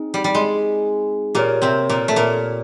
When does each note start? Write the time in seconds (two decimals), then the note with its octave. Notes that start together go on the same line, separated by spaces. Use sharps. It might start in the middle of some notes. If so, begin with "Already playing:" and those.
Already playing: C4 D#4 G#4
0.14 G3
0.24 G3
0.35 G#3
1.35 A#2 A#3 G4 A#4 C#5
1.62 C3 C4
1.89 A#2 A#3
2.08 A3
2.16 A#2 A#3